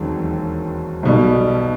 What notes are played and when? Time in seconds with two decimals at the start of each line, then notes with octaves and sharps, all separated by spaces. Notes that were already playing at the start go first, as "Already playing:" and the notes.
Already playing: E1 D#2 D#3 F#3 C4
1.03 B1 B2 G3